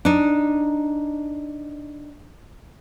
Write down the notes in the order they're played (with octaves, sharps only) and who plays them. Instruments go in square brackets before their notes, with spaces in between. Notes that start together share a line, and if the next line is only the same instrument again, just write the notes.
[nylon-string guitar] D4 D#4